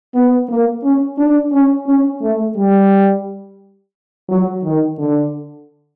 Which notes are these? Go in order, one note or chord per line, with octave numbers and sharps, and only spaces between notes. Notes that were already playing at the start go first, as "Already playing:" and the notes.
B3
A#3
C#4
D4
C#4
C#4
A3
G3
F#3
D#3
D3